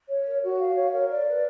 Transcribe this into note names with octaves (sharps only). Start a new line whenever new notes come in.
C#5
A#4
F#4
F5
C#5
A#4
D5
B4